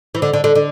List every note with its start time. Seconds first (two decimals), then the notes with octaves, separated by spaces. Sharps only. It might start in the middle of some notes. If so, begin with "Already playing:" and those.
0.15 E3
0.22 D3
0.33 D3
0.44 D3
0.55 D3